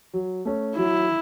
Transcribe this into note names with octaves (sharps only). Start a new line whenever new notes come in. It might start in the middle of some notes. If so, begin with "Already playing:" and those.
F#3
A3 C#4
F#3 E4